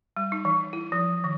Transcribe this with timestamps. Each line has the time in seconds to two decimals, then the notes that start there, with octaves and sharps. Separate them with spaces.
0.17 G3
0.32 D#4
0.45 E3
0.73 E4
0.92 F3
1.24 D#3